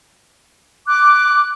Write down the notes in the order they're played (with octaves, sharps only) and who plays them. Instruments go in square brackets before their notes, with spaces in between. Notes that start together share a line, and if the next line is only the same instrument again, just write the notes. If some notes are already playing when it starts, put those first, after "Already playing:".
[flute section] D6 [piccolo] F#6